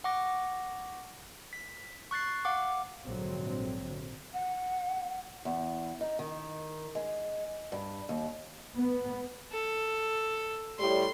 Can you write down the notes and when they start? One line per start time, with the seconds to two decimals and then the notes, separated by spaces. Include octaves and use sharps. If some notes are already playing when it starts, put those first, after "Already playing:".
0.04 F#5 C#6 D6 A#6
1.53 B6
2.11 C#6 F#6 A6 C7
2.45 F5 F#5 D6
3.04 A#1 G#2 D3 F#3 C4
4.34 F#5
5.45 E2
6.01 D#4
6.19 D#3
6.95 G#3
7.72 G2
8.09 D#2
8.76 B3
9.52 A4
10.79 A2 G3 C6